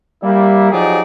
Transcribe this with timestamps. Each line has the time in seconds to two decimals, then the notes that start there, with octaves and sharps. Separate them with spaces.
0.23 G3 A#3 E4
0.72 F3 F#3 D#4 G4 G#4 D5